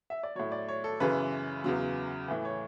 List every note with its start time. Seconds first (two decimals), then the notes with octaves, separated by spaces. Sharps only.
0.10 E5
0.23 D5
0.35 A2 F#3 C#5
0.52 D5
0.68 C#5
0.84 A4
1.00 F#2 C#3 E3 B4
1.64 E2 C#3 F#3
2.28 A2 E3
2.45 C#5